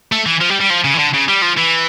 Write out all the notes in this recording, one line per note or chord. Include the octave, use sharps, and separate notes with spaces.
A3
E3
F3
G3
G3
F3
C#3
E3
D3
C#3
G3
F3
E3